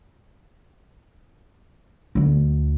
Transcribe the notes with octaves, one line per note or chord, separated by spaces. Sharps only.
D2 D3